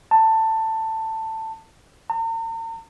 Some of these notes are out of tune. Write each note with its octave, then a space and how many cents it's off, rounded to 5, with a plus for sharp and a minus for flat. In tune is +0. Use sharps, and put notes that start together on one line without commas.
A5 +15
A#5 -45